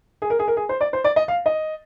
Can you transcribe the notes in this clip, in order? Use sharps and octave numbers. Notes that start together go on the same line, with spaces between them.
G#4
A#4
G#4
A#4
G#4
C5
D5
C5
D5
D#5
F5
D#5